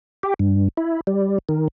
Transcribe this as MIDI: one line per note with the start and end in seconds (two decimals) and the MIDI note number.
0.23 0.34 67
0.39 0.68 43
0.77 1.01 64
1.07 1.38 55
1.49 1.68 51